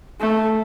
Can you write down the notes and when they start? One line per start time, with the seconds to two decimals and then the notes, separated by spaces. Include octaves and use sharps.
0.20 A3